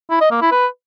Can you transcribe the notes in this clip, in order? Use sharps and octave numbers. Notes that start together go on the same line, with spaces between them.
E4
D#5
A#3
E4
B4